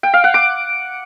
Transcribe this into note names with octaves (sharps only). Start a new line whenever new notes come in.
G5
F5
F#5
D6